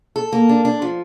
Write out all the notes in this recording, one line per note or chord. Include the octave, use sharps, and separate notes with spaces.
A4
A#3
D4
D4
F3